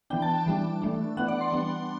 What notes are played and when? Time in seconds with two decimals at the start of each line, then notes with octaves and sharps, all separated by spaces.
0.10 E3 B3 D4 G5
0.22 A5
0.46 E3 G3 D4
0.82 E3 A3 D4
1.17 E3 B3 D4 F#5
1.28 D5
1.41 C6
1.52 G3 B3 D4